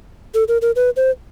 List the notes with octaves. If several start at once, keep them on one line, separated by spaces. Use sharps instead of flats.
A4
A#4
A#4
B4
C5